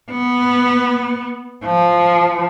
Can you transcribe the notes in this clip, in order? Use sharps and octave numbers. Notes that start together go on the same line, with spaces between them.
B3
F3